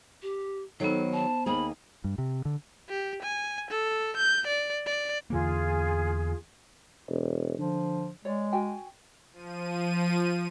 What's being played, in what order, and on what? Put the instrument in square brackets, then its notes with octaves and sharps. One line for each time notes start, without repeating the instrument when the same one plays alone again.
[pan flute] G4
[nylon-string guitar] D#3 F#3 [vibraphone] B3 C5 [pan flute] A4
[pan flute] A5
[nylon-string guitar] D#2 A#3 G#4 [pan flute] B5
[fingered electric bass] G2
C3
D3
[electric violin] G4
G#5
A4
G6
D5
D5
[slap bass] E2 D3 A#3 [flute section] F4 G#4
[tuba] E1
[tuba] D3 [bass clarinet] F3
[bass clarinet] G#3 [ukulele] C#5 D5
[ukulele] F#4 G5 G#5
[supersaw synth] F3 D#7